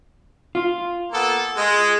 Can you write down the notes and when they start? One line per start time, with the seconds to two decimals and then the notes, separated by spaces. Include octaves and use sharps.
0.55 F4
1.12 A#3 B3 A4
1.57 G#3